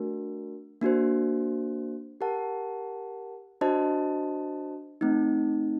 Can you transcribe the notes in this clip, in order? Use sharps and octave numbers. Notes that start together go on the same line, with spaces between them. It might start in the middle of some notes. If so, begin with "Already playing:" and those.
Already playing: A3 D4 F#4 A#4
A#3 D4 F#4 C5
G4 A#4 F#5 A5
D4 F#4 C5 D#5 A5
A3 C4 D#4